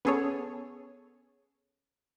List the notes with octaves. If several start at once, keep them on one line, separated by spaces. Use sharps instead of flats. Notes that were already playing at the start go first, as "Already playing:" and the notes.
B3 C#4 G#4 A4 C#5